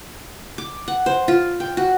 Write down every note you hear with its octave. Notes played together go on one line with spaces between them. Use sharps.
D6
F#5
C5
F4
G5
F#4